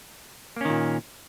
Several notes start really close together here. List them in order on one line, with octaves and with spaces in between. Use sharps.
A#3 C#4 D#3 A#2